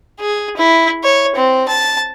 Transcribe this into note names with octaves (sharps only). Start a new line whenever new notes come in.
G#4
E4
C#5
C4
A5